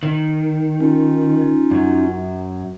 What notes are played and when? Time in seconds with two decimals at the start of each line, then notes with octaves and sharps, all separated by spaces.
0.03 D#3
0.81 C#4 D#4 F4
1.71 F#2 F#3